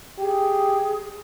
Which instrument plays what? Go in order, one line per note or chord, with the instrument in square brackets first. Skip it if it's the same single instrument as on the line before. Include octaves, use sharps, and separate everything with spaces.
[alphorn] G4 [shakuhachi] G#4